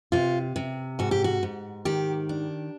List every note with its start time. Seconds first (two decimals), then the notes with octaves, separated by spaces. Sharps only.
0.12 C3 F4
0.56 C3
0.99 G#2 F#4
1.11 G4
1.24 F#4
1.43 G#2
1.85 D#3 G4
2.29 D4